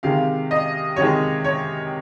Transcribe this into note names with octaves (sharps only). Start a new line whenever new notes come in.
C3 D#3 G#3 F5
D#5
C3 D#3 G#3 C#5
C#5